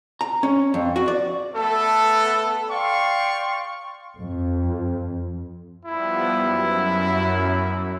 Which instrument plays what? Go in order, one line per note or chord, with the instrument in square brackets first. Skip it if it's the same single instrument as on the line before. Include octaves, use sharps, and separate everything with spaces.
[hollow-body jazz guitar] A#5
C#4
F2
F#4
D5
[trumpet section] A3 B3 A4
D5 F5 G5 C6 C#6
[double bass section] F2
[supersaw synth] F3 G3 B3 [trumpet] E4
[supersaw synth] F#2